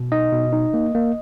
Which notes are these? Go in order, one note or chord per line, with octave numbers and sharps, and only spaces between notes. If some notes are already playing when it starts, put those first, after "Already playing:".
Already playing: B2
D#4 D#5
B2
D#4
A#3
A#3